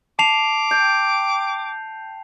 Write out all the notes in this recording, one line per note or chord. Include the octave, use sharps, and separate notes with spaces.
A5 D6 C7 F7
G5